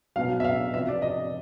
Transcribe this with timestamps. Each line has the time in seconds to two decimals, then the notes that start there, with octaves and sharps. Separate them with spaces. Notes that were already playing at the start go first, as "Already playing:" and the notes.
0.16 B2 F#3 F5
0.40 E5
0.44 F5
0.74 C3 F3 E5
0.88 D5
1.02 D#5